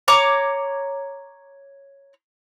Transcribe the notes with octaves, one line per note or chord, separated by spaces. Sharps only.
C#5 A#5 D6